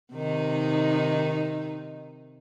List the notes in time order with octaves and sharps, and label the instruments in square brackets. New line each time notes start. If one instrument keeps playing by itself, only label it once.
[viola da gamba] C3 D#3 D#4